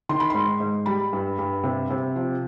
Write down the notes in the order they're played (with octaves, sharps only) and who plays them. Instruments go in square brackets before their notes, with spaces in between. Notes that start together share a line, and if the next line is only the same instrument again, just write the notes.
[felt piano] D#3 C6
B5
G#2 C6
G#2
G3 B5
G2
G2
C3
C3
F3